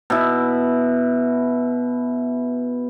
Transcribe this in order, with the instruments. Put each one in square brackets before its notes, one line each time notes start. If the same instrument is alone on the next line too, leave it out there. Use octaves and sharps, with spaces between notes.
[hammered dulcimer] B2 E4